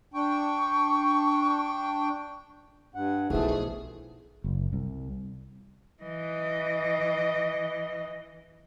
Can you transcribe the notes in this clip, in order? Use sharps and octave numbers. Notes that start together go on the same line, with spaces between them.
D4 G5 C#6
G2 F#5
B1 B2 E3 F3 A3 D#4 G#4
F#1
C2
E3 D#5